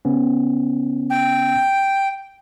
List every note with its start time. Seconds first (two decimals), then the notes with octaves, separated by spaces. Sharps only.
0.05 C#3 B3 C#4
1.10 G5